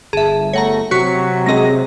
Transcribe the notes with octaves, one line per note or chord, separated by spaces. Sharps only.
G1 G#4 E5 A5
A3 C#5 F#5 A#5 A#6
C3 F#3 F#4 C#6 B6
G#3 C4 G#4 D#5 A#6